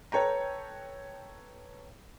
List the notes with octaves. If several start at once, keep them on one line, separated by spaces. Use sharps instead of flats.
A4 B4 C#5 G5 A#5